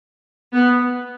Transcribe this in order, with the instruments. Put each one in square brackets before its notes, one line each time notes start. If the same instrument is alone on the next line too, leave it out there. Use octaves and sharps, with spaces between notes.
[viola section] B3